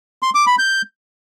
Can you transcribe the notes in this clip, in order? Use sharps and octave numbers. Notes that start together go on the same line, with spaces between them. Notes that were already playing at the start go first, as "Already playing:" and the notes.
C6
D6
B5
G6